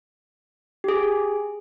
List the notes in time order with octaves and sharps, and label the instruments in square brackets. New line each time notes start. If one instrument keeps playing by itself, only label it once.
[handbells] G4 G#4